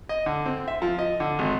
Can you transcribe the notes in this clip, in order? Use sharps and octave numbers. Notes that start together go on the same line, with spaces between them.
D#5
D3
C4
E5
F3
D#5
D3
G#1